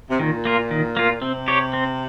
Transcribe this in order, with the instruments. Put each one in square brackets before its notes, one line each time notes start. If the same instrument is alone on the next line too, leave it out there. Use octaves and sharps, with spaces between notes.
[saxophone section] C3
[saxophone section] A#2 [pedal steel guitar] D#3
[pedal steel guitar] A#3 F4
D#3
A#3 F4
[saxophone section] C3 [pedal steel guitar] C4
[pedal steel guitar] G4 C#5
C4